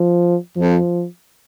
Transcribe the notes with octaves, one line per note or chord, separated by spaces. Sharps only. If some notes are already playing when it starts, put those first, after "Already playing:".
Already playing: F3
F2 F3